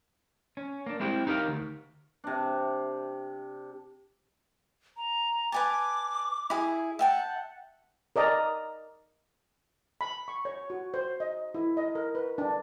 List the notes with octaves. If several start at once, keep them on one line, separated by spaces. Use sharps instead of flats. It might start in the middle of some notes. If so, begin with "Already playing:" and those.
C#4
A#3 D4
G#3 C4 E4 G4
D#4 G4 A#4 F5
D2
C3 D4
A#5
B4 G#5 A5 D6
E4 G#4
E5 F#5 G5 A5
A#4 D5 D#5 A#5
B5
C#6
C#5
F#4
C5
D#5
E4
D#5
A#4
B4
D4